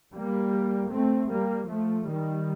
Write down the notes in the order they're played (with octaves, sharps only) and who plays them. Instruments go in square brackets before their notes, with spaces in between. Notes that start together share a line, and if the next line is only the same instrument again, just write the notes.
[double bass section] G3 A#3
A3 C4
G3 A#3
F3 A3
D#3 G3